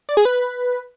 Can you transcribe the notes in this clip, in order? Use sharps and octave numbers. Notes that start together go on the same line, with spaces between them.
D5
G#4
B4